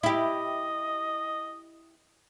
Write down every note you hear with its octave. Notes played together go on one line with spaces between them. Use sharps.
E4 G4 D#5